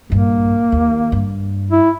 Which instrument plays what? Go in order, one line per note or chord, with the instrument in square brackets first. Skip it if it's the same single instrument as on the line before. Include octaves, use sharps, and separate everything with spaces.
[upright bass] A#1 G2 [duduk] A#3
[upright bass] D#2
G2
[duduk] E4